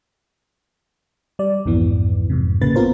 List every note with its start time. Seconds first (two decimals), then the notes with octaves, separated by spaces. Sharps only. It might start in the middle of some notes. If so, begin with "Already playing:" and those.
1.39 G3 D5
1.65 B1 F2 G#2 E3 B3
2.30 F2 G#2 C3
2.61 A1 C#3 A#3 B4 A6
2.76 B3 C4 F4 A#4 C5